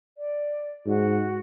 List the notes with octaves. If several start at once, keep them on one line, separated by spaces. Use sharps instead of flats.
D5
G#2 F#4